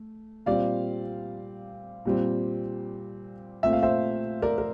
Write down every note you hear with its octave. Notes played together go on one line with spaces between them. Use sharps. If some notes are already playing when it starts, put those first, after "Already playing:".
Already playing: A3
A#2 G3 C4 D5 F5
A#2 G3 C4
A#2 A3 C4 E5
F5
C5 E5
A#4 D5
A#4